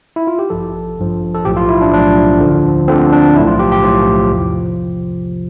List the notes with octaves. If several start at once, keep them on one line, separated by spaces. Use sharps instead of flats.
E4
F4
G4
A1 G2 F3 A4
A1 G2 F3
A4
B1 A2 F3 G4
F4
E4
D4
B1 A2 F3 D4
D2 D3 F3
D2 D3 F3 C4
D4
B1 A2 F3 E4
F4
G4
G4
B1 A2 F3 F4
E2 C3 F3